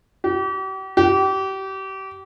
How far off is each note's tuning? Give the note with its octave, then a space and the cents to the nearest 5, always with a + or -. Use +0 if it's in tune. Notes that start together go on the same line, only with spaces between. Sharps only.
G4 -40
G4 -30